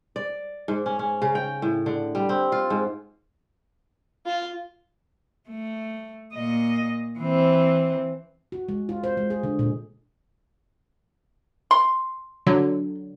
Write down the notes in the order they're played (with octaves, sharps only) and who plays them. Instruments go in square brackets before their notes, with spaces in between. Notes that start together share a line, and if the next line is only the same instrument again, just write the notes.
[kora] D5
G#2
C#4
C#4
C#3
G5
A2
D3
G3
C4
F4
G#2
[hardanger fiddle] F4
[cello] A3
A#2 D#5
E3 C4
[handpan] F#4
G#3
F4
C5
G#3
G#4
D3
A#2
[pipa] C6
[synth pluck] D3 F#3